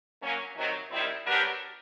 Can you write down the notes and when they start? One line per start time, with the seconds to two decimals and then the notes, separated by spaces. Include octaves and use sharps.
0.20 F#3 A#3 C#4
0.56 C3 D#3 F#3
0.91 D#3 G3 C4 E4
1.26 F#3 B3 D4 G4 A#4